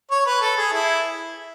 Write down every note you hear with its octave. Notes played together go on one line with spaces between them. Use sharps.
C#5
B4
A4
G#4
E4